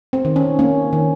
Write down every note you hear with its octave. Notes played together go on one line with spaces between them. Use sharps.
C4
D#3
C#4
A#3 C#4
D#3